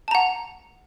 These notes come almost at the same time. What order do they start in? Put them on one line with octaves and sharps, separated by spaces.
A5 A#5 F#5